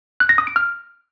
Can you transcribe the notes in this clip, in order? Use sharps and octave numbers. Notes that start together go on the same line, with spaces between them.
F#6
A#6
D#6
D7
F6